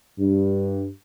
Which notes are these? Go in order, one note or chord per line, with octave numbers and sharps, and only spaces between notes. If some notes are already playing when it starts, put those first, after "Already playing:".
G2